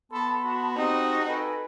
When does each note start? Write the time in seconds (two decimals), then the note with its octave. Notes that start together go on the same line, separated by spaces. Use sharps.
0.12 B3 A4 A5 B5 C6
0.45 F#4
0.77 C4 D#4 G4 A5 D#6
1.28 A4 B4 G5 G#5